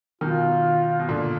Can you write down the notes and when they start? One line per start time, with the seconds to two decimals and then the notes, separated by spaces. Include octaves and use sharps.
0.21 B2 D#3 F4
0.99 B2
1.09 A#2 D3